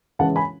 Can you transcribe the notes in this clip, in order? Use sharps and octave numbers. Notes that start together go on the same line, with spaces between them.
C#3 E3 G#3 C#4 F#5 A5
G#5 B5